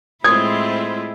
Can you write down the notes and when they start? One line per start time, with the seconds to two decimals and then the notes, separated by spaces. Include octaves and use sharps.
0.24 A2 G#3 C4 E4 F4 D#6 G#6